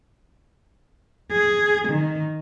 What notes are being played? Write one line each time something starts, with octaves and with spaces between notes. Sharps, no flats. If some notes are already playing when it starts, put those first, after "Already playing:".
G#4
D#3